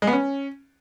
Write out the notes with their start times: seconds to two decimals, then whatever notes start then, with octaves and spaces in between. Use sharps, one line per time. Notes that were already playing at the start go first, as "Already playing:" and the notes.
0.02 G#3
0.07 B3
0.13 C#4